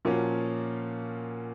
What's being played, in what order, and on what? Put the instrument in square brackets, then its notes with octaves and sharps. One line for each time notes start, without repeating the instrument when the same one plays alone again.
[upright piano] A#2 F3 A#3 C#4 F#4